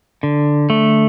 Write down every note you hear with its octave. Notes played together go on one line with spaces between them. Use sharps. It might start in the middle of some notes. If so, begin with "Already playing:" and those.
D3
A3